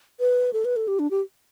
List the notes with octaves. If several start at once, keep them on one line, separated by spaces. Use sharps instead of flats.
B4
A4
B4
A4
G4
D4
G4